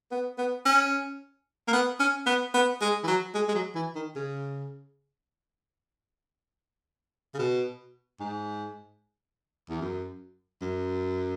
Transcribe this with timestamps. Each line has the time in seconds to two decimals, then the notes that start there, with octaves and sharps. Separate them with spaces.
0.11 B3
0.38 B3
0.65 C#4
1.68 A#3
1.73 B3
2.00 C#4
2.26 B3
2.54 B3
2.81 G#3
3.03 E3
3.08 F#3
3.35 G#3
3.48 G#3
3.55 F#3
3.75 E3
3.95 D#3
4.16 C#3
7.34 C#3
7.39 B2
8.20 G#2
9.70 E2
9.81 F#2
10.62 F#2